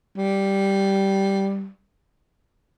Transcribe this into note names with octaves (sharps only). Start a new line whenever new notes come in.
G3